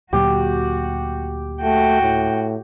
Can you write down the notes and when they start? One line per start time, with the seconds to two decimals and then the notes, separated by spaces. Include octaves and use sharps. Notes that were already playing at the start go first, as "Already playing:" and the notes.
0.13 D2 A#2 F#3 F#4 G4
1.62 A3 F#4 G5
2.02 A2